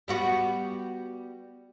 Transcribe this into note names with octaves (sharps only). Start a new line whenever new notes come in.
G3 B3 F#4